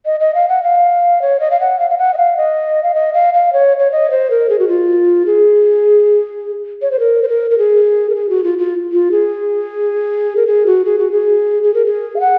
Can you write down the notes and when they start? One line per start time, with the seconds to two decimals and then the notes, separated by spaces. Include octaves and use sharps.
0.06 D#5
0.20 D#5
0.35 F5
0.49 F#5
0.63 F5
1.22 C#5
1.40 D#5
1.51 F5
1.60 F#5
1.79 F5
1.90 F5
1.98 F#5
2.14 D#5
2.18 F5
2.37 D#5
2.83 F5
2.95 D#5
3.14 F5
3.34 F5
3.53 C#5
3.79 C#5
3.92 D#5
4.11 C5
4.31 A#4
4.49 G#4
4.59 F#4
4.68 F4
5.26 G#4
6.82 C#5
6.91 C5
6.99 A#4
7.23 C5
7.28 A#4
7.51 A#4
7.58 G#4
8.10 A#4
8.15 G#4
8.30 F#4
8.44 F4
8.58 F4
8.92 F4
9.12 G#4
10.36 A#4
10.47 G#4
10.66 F#4
10.85 G#4
10.99 F#4
11.12 G#4
11.63 G#4
11.74 A#4
11.86 G#4
12.16 F5
12.20 F#5